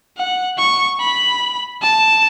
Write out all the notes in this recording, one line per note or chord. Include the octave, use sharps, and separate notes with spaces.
F#5
C#6
B5
A5